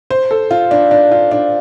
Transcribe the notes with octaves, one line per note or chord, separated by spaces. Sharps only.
C5
A4
F4
D4
D4
F4
D4